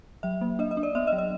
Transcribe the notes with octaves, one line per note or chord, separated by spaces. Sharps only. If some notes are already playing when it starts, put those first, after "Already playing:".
F#3 E5
A#3
D4 D#5
D#5
D4
D5
B3 E5
D#5
F#3
D#5